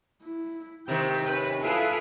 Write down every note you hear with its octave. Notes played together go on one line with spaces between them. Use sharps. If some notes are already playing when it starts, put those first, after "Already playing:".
E4
C3 D#3 C5 G5
C#4 B4
E4 F4 G#4 A4 B4